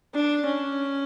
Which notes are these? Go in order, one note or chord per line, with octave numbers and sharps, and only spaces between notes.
D4
C#4